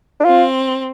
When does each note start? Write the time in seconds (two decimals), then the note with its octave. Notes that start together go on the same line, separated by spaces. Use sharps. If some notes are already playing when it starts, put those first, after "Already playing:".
0.20 D4
0.25 C4 F4